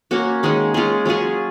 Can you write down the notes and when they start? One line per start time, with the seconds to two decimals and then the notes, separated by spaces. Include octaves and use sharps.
0.11 A#3 C#4 F#4
0.43 D#3 G#3 C#4
0.74 G#3 C#4 F4
1.05 F#3 C#4 F4 G#4